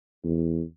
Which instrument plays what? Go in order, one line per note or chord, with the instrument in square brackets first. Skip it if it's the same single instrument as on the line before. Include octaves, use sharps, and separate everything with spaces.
[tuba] E2